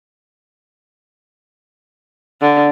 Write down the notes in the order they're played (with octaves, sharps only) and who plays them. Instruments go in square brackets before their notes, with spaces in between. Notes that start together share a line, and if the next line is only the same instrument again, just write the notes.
[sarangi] D3